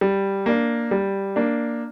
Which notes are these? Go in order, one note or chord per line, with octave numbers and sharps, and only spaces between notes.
G3
A#3 D4
G3
A#3 D4